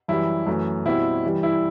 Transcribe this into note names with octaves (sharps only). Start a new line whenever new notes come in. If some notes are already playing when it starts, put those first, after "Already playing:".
F#2 E3 G3 E4
F#2 E3 A3
B2 G3 C4 E4
G2 E3 G3
E4